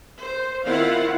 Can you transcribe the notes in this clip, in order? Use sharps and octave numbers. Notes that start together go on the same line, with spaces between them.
C5
D#3 C4 E4 F4 F5 F#5